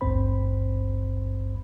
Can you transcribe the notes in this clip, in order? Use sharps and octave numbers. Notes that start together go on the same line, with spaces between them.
G#1 D2 G2 C4 C5 B5